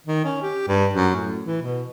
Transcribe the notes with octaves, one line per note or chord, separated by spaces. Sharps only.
D#3
C#4
G4
G2
F#2
A2
E3
B2